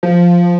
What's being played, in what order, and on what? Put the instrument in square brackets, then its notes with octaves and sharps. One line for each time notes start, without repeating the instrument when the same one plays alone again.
[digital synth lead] F3